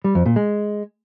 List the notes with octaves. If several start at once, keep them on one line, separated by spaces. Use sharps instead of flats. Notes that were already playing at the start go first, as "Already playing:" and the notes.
G3
F2
A#2
G#3